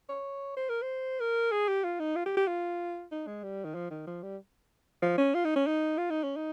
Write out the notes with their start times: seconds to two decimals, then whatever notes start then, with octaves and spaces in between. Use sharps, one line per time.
0.09 C#5
0.57 C5
0.69 A#4
0.82 C5
1.20 A#4
1.52 G#4
1.68 G4
1.84 F4
2.00 D#4
2.16 F4
2.26 G4
2.37 G4
2.47 F4
3.12 D#4
3.27 G#3
3.43 G3
3.65 D#3
3.75 F3
3.91 D#3
4.07 F3
4.23 G3
5.02 F3
5.18 C#4
5.35 F4
5.45 D#4
5.56 C#4
5.67 D#4
5.98 F4
6.10 D#4
6.24 C#4
6.36 D#4